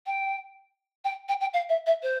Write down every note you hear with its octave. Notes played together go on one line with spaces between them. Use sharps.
G5
G5
G5
G5
F5
E5
E5
C5